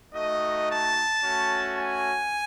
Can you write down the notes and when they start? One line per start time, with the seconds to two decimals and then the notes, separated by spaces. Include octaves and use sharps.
0.12 A3 D#4 F#4 D#5
0.68 A5
1.23 A3 C#4 F#4
1.78 G#5